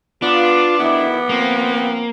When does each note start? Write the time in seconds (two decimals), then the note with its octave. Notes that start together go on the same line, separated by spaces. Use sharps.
0.22 B3 D4 F4 B4 D6
0.79 D2 D#3 B3 E4
1.29 F3 A#3 C4